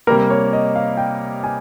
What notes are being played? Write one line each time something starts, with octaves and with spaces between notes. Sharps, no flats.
C3 G3 A#3 A#4
C#5
D#5
F5
G5
G#5